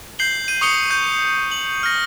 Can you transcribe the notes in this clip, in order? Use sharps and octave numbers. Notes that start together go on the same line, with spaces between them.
G6 C7 F#7 G7
G6 D#7
C#6 D#6 C#7 G7
G6
F#7
F6 A#6